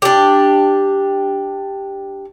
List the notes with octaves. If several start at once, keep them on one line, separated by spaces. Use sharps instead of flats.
D4 G4